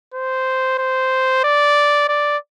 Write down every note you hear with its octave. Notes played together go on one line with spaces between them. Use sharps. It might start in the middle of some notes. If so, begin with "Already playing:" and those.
C5
C5
D5
D5